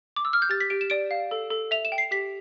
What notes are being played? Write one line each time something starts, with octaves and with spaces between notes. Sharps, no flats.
D6
E6
F6
G6
G4 A6
B6
G4 D7
E7
D5 D7
F5
A4
A4
E5 F7
E7
G5
C7
G4 B6